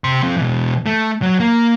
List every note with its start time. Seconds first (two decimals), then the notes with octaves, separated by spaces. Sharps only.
0.04 C3 C6
0.23 F3 C4
0.37 B2 E3
0.86 A3
1.22 F#3
1.40 A#3